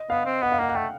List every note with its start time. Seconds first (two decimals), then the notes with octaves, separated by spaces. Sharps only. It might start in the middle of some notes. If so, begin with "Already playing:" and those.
Already playing: D#5
0.10 B3 F5
0.25 C4
0.42 B3 F#5
0.52 F5
0.59 A#3 F#5
0.69 F#5
0.75 A3 G5